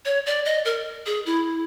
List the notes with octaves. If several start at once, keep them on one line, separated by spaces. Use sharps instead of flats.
C#5
D5
D#5
A#4
G#4
E4